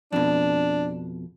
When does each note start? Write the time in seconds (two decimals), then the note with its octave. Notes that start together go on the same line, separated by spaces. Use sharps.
0.12 F2 B2 D4